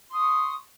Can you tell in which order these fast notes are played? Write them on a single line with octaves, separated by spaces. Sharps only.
C6 D#6 C#6